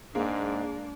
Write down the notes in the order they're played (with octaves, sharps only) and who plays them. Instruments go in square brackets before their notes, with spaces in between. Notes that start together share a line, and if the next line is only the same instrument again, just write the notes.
[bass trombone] G#2 [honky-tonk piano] G#3 A#3 [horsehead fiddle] D4